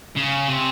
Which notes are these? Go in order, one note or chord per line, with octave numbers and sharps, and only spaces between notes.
C#3
C3